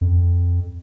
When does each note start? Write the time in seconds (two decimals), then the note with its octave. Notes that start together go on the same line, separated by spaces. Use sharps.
0.01 F2